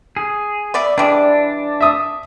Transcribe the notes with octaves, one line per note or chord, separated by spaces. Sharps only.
G#4
B3 D5 E5
E3 G3 G#3 D4
E5 D#6